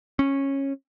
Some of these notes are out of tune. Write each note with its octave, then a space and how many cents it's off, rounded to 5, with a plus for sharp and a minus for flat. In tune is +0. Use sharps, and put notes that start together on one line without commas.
C#4 -15